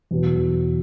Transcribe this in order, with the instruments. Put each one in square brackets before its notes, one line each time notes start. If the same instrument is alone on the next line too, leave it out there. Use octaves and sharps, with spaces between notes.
[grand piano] E2 B2 F#3